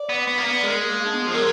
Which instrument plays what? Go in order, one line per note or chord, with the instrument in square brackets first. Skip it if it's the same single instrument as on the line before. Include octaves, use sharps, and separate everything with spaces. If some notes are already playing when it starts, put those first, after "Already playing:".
Already playing: [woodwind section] D5
[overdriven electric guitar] B3
B3
A#3
B3
[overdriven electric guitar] G#3 [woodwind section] A#4
[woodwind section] G#4
A#3
A#3
D4
B3
[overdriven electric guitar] F3 [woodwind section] G#4
[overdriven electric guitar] F#3 [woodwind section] A#4